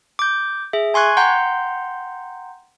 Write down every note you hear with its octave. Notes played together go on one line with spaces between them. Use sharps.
D6 G6
G#4 E5
G#5 C6 C#6 F#6 G#6
F#5 G5 A#5 C6 G6